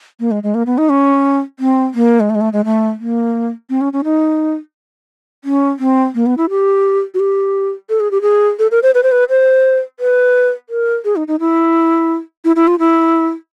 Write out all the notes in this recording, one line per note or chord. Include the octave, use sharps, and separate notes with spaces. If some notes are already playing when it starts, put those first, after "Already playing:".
A#3
G#3
G#3
A#3
B3
D#4
C#4
C4
A#3
G#3
A3
G#3
A3
G#3
A3
A#3
C4
C#4
C#4
D#4
C#4
C4
A#3
B3
E4
G4
F#4
G4
A4
G#4
G4
G#4
A4
A#4
C5
B4
C5
B4
C5
B4
A#4
G#4
D#4
D#4
E4
E4
E4
F4
E4